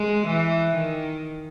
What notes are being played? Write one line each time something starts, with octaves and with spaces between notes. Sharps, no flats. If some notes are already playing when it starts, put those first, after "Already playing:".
Already playing: G#3
E3
D#3